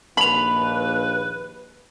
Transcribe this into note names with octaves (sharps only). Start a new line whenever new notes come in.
A#1 D#2 B4 B5 F7 F#7